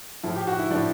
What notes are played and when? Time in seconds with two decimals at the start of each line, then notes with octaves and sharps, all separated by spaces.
0.23 A2 F3 E4
0.36 G4
0.47 F#4
0.59 E4
0.70 A2 F3 D4